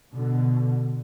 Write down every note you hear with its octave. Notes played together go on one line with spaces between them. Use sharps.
B2 D3